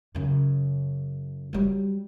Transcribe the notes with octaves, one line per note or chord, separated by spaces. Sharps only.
F#2 C#3
F#3 G3